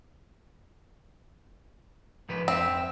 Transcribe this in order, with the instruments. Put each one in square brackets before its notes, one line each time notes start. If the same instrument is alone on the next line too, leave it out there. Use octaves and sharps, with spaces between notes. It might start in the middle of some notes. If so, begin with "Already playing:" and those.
[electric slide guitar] G#2 F3 B4
[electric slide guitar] F2 E5 [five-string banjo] C4